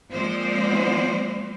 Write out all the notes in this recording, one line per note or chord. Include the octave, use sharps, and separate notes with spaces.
F3 G#3 A#3 C4 C5 D5